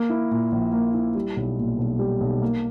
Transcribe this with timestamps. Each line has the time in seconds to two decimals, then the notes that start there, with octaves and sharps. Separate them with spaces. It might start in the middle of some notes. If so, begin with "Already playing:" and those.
Already playing: A#3
0.10 E4
0.31 A#2
0.52 A#1
0.72 A#3
0.94 E4
1.15 G3
1.36 B1
1.58 A#2
1.78 B1
1.99 G3
2.21 B1
2.42 A#3